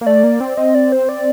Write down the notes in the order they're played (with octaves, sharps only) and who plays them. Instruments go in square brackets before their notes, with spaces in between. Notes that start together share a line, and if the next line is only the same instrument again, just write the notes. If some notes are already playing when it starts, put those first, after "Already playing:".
[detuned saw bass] A#3
[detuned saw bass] A3 [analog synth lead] D5
[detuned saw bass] A#3
C4
[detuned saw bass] C4 [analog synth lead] D#5
[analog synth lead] D5
C5
D5